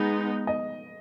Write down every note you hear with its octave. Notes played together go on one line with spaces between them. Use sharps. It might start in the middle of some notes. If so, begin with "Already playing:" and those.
Already playing: G#3 B3 D#4
D#5